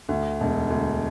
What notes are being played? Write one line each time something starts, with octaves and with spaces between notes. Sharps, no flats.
D2
E1
D2